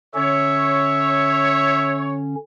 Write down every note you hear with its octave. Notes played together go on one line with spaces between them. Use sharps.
D3 C#4 C#5 E5